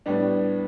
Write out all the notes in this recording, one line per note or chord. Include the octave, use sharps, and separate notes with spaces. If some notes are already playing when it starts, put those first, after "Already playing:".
A2 G3 B3 D4